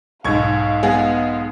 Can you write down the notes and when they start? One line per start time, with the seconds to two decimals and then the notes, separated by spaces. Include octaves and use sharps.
0.24 B1 G#2 F5 C#6 G#6
0.83 G#3 B3 G#4